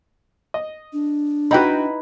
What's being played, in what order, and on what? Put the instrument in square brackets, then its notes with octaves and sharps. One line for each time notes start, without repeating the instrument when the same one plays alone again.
[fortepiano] D#5
[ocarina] D4
[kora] D#4 E4 B4 [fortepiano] F#4 G5 B5